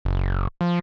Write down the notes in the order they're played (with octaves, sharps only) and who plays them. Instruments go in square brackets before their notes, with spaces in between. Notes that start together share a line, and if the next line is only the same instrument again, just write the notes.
[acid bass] F#1
F3